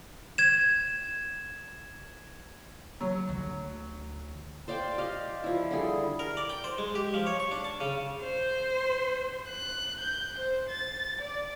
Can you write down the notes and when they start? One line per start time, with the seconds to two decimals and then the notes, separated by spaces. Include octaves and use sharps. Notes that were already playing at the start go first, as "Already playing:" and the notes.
0.38 G#6 E7
3.01 F#3
3.29 D2
4.68 C5 D5 F5 G5
4.98 G4 D5 D#5 F5
5.44 F3 E4
5.71 D3 G3 G#4
6.19 A#4
6.37 D5
6.50 G5
6.64 C5
6.78 G#3
6.95 G4
7.14 F3
7.27 C#5
7.40 C#6
7.51 D4
7.65 A5
7.81 C#3
8.21 C5
9.48 F#6
9.99 G6
10.38 C5
10.69 A6
11.21 D5